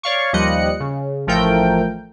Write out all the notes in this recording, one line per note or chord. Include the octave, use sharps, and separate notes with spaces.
C#5 D5 F5 C#6
D#2 F3 G3 D#5 F#6 C#7
C#3
A1 F3 A3 A#4 G5